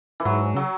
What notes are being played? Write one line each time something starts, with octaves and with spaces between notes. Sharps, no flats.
E3
G#2 F#3
C#3 F#3